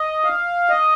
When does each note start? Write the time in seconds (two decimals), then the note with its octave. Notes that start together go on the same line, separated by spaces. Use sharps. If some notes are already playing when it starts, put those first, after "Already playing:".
Already playing: D#5
0.24 F5
0.69 D#5